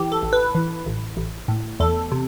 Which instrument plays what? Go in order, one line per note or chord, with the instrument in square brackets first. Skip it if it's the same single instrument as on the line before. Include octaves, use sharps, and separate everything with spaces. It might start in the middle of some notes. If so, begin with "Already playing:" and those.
Already playing: [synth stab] E3 G4
A4
A1
B4
E3
A1
A1
A2
E2 A4
C3